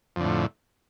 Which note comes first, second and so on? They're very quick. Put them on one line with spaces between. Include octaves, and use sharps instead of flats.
F2 D3 A2